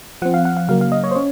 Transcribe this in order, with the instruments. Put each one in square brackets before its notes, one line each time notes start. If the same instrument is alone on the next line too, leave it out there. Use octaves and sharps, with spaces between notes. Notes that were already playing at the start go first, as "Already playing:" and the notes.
[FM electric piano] F3 C4 F#5
F5
F#5
F5
C#3 F#3 A#3 F5
F5
D#5
C#5
C5
C#4 C#5